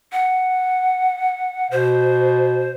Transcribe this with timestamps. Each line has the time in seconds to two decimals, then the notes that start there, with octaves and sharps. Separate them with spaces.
0.13 F#5
1.71 B2 C5